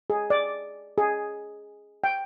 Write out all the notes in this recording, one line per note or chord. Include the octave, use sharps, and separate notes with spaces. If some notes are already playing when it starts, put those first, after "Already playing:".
G#4
D5
G#4
G5